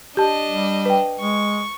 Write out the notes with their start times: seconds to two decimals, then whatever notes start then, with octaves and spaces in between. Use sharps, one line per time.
0.17 D4 G4 D#5 A5
0.48 G3
0.85 B4 G5
1.20 G#3 C#6